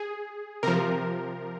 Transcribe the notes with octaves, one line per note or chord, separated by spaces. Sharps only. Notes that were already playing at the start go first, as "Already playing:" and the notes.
Already playing: G#4
C3 F3 A#4